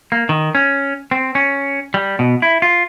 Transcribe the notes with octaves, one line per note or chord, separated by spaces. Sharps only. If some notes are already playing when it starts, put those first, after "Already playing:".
A#3
D#3
C#4
C4
C#4
G3
B2
E4
F4